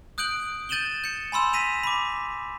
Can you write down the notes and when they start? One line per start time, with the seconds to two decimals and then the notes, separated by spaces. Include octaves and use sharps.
0.18 D#6 F#6 G6 D7 F#7
0.69 G6 A6 D#7 E7 F#7 G7
1.04 G6 C#7
1.32 G#5 B5 C6 E6 E7
1.53 A#6 B6 D#7 F7
1.83 B5 D6